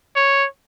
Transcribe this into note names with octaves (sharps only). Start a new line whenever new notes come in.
C#5